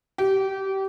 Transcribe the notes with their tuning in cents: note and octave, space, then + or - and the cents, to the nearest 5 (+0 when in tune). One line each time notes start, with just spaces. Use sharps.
G4 -25